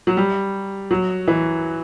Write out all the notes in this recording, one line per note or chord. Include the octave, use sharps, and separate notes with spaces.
F#3
G3
F#3
E3